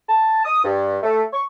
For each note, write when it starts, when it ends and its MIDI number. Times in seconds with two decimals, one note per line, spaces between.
0.09 0.45 81
0.45 0.64 87
0.64 0.98 43
1.03 1.23 57
1.33 1.42 85